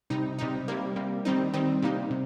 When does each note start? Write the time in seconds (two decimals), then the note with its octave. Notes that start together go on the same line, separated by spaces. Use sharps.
0.10 C3 G3 D#4
0.38 C3 G3 D#4
0.68 C3 G3 A#3
0.96 C3 G3 A#3
1.25 D#3 G3 C4 D#4
1.53 D#3 G3 C4 D#4
1.82 C3 G3 A#3 D#4
2.11 C3